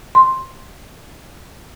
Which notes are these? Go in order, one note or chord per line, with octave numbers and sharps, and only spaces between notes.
C6